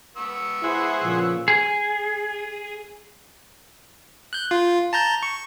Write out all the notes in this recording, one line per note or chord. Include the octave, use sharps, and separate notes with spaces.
B3 C#6 E6
E4 G#4 C5 F#5
A#2 C#3 F3
G#4
F#6 G6
F4
A5 A#5 G6
C#6